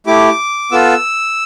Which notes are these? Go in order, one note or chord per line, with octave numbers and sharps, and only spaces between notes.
A3 E4 G4 D6
B3 F4 A4 E6